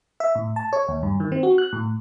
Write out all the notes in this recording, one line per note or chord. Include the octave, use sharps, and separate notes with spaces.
E5
A2
A5
C#5
D#2
G2
D#3
C4
F#4
F#6
A2